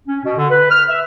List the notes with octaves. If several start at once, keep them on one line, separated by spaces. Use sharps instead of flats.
C#4
B2
D3
B4
F6
E5